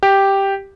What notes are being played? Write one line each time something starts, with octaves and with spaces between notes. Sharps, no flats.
G4